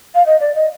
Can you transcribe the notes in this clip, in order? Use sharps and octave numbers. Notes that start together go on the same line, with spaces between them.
F5
D#5
D5
D#5